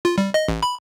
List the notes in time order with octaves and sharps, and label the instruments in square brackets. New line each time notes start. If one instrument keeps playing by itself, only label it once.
[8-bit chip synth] F4
G3
D#5
A1
B5